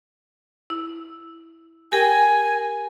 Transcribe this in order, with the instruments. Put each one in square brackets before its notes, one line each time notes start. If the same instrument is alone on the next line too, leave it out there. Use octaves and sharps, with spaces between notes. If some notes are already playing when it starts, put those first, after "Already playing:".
[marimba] E4
[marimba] G4 A#4 G5 [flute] G#5